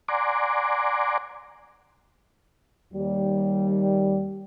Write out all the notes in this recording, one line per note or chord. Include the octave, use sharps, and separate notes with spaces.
D5 F#5 G#5 A#5 C6 D6
D#2 G3